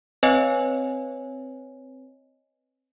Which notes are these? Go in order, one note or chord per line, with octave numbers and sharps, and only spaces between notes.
C4 B4 C#5 D#5 G#5